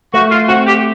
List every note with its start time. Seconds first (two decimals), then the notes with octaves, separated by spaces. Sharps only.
0.13 A3 F#4
0.31 F4
0.48 C4 F#4
0.67 G4